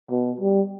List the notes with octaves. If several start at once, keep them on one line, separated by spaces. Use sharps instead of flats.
B2
G3